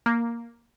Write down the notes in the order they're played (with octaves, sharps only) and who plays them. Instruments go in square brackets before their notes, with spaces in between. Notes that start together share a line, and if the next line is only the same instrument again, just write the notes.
[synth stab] A#3